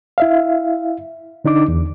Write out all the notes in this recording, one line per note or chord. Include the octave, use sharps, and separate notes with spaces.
E4 E5 F5
D3 D4 D#4 D6
E2